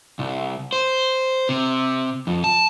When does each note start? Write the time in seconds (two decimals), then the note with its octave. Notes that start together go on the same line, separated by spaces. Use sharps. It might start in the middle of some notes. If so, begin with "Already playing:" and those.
0.19 C2
0.73 C5
1.49 C3
2.27 F2
2.44 A5